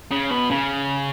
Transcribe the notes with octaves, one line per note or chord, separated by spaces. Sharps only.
C#3
B2
C#3